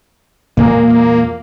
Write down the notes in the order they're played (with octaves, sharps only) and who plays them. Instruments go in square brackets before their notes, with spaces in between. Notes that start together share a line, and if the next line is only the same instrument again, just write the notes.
[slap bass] E2 A#2 G#3 [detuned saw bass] A#3